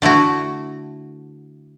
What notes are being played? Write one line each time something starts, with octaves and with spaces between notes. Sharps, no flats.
D3 A3 E4 F#4